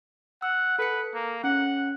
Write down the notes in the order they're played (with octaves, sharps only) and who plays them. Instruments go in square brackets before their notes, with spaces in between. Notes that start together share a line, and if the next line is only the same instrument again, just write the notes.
[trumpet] F#5 [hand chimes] E6
[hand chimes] A4 C#7 [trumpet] B4
[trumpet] A#3
[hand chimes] C#4 [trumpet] F#5